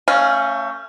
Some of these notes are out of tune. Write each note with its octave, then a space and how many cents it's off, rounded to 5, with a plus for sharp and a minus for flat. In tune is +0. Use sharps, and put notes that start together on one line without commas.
A3 +30 C#4 -5 F5 +0